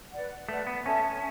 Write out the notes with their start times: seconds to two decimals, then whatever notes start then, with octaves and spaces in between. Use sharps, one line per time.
0.11 B4 D5 F#5
0.49 A3 B4 D5 F#5
0.67 B3
0.85 C#4 A4 E5 A5